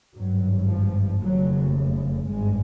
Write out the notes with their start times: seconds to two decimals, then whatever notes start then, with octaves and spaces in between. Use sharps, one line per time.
0.14 G#1 G2 F#3
0.67 F3
1.21 F1 D#2 C#3 F#3
2.26 G#1 G2 G#3